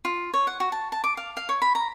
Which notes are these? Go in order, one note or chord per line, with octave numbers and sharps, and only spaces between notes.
F4
C#5
F#5
F#4
A5
A5
D6
F5
F5
C#5
B5
A#5